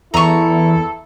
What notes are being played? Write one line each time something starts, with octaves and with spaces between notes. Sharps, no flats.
E2 E4 A4 A#5 C#6